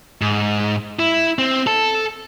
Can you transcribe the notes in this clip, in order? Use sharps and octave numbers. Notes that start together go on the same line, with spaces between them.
G#2
E4
C4
A4